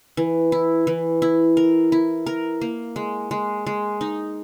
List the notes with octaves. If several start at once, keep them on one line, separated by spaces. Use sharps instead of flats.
E3
E4
E3
E4
A#4
E4
A#4
A#3
G#3
G#3
G#3
D#4